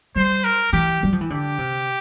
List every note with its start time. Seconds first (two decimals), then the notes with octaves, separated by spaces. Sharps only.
0.16 G3 C5
0.44 A#4
0.73 E3 G4
1.03 G3
1.13 F3
1.21 E3
1.30 D3 G4
1.59 C3